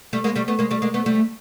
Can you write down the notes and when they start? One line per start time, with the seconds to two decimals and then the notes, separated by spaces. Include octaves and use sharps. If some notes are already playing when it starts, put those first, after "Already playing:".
0.13 G3 A3
0.24 G#3 A#3
0.35 G3 A3
0.48 A3 B3
0.59 G#3 A#3
0.71 G3 A3
0.82 G#3 A#3
0.94 A3 B3
1.06 G3 A3